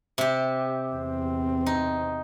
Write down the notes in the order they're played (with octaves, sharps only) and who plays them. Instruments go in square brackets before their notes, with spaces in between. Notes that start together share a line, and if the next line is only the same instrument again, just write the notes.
[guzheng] C3 G4
[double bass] E2 C4
[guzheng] D#4